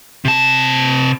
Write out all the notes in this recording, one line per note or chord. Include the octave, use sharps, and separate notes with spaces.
C3 A5